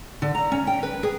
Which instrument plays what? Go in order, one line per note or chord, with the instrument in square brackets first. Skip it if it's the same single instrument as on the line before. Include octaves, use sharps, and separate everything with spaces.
[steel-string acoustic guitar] D3
A#5
C#4
G5
B4
G#4